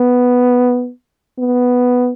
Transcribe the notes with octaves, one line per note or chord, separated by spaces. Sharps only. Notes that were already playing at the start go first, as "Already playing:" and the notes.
Already playing: B3
B3